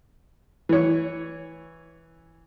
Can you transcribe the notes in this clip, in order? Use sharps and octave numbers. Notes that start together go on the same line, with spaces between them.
E3 C#5